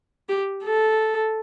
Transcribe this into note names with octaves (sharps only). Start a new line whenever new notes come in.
G4
A4